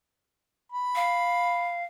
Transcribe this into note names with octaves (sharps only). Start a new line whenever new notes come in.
B5
F5